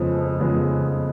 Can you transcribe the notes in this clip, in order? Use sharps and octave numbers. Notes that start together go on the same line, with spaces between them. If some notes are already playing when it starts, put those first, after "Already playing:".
Already playing: F2 C#3 F3 G#3 B3
F2 C#3 F3 G#3 B3